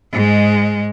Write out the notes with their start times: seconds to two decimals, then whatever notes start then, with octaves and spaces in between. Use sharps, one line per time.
0.12 G#2 G#3